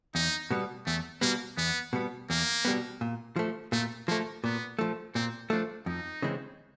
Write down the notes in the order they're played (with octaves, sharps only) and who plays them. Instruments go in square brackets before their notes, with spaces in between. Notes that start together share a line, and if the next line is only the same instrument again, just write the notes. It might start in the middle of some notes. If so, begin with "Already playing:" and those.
[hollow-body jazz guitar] E2 [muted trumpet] D#4
[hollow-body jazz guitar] B2 G3 B3
[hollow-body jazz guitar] E2 [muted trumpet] A3
[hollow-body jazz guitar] B2 G3 B3 [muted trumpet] A#3
[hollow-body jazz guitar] E2 [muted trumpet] B3
[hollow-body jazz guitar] B2 G3 B3
[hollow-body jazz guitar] E2 [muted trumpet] A#3
[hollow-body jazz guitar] B2 G3 B3
A#2
F3 A3
[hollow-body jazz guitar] A#2 [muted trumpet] A3
[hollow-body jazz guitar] F3 A3 [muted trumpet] A#3
[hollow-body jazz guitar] A#2 [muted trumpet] B3
[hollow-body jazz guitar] F3 A3
[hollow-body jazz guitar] A#2 [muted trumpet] C4
[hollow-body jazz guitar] F3 A3 [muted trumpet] D4
[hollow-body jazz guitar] F2 [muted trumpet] D#4
[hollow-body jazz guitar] C#3 E3 G#3 C4